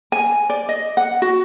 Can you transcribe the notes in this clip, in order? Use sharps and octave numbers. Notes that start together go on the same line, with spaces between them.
G#5
D5
D#5
F#5
F#4